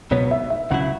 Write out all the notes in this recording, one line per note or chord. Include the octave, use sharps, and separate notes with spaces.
C#2 B2 F#3 B3 C#5
E5
E5
C#2 C#3 F#3 E4 F#5